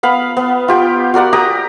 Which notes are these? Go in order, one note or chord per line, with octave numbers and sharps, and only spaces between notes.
B3 F5 B5
B3
F4 G4 G5
F#4 A#4 D5 F#5
G4 A#5 D#6